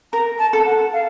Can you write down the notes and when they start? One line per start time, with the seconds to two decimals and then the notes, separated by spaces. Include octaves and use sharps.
0.13 A#4 A#5
0.39 A5
0.53 A4
0.66 F#5
0.93 F5